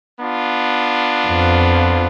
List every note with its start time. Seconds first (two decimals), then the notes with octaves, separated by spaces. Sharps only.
0.20 B3 D4 F4
1.27 F2